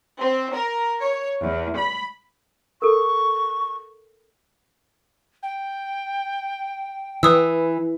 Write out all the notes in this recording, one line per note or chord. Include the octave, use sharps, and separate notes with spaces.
C4
A#4
C#5
E2
B5
A4 A#4 C#6
G5
E3 B4 D#6 E6